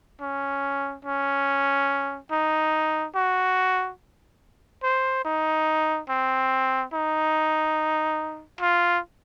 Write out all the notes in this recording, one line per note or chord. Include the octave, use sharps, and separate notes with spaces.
C#4
C#4
D#4
F#4
C5
D#4
C4
D#4
F4